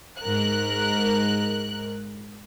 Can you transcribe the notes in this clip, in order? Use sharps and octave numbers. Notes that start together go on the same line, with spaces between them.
G#2 A#4 F#6